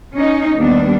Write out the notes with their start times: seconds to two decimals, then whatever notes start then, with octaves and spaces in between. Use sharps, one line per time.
0.14 C#4 D#4
0.57 D#2 G3 B3 D4